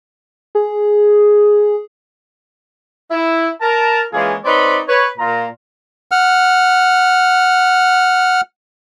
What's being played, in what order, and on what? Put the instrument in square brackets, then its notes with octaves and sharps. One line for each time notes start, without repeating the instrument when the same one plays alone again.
[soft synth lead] G#4
[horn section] E4
A#4 A5
E3 G#3 A#3 C#4 F4 G#4
C4 D#4 B4 C#5 D5 B5
B4 C#5
A#2 F4 A#5
[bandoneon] F#5 F6